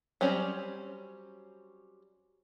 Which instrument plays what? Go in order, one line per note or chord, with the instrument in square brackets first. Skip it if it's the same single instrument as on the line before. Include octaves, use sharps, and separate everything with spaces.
[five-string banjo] F#3 G3 C4 C#4